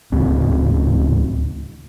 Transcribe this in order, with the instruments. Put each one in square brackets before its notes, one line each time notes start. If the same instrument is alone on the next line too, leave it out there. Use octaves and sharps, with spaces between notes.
[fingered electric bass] D1 C#2 C4